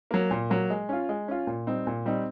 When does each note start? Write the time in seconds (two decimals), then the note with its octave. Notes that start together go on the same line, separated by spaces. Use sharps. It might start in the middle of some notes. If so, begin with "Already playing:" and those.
0.11 F#3 A#3
0.31 A#2
0.50 F#3 A#3
0.70 G#3
0.89 C#4 F4
1.09 G#3
1.28 C#4 F4
1.47 A#2
1.67 G3 C4 D#4
1.87 A#2
2.06 G3 C4 D#4